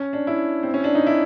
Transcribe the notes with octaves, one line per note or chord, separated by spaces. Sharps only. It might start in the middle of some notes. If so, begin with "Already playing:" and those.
Already playing: C#4
D4
E4
C4
C#4
D4
D#4
E4